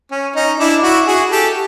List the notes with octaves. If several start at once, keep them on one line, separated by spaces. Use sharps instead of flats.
C#4
C#4 D#4
D4 E4
E4 F#4
F#4 G#4
G4 A4